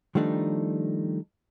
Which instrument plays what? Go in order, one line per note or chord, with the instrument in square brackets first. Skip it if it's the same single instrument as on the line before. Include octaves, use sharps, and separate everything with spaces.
[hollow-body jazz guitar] D#3 F3 G3 A3 D4 D#4